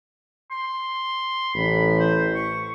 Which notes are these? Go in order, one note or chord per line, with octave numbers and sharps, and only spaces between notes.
C6
A1 B5
C5
C#6